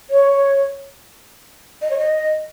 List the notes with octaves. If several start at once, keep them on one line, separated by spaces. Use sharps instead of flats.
C#5
D#5
C#5
D#5